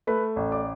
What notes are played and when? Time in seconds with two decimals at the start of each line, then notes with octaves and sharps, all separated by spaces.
0.07 A3 B4 B5
0.36 A1
0.52 D5 D6